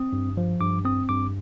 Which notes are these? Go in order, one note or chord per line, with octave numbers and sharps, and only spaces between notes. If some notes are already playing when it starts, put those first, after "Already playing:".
Already playing: C4 D#6
G2
F3
G2 D6
C4 D#6
G2 D6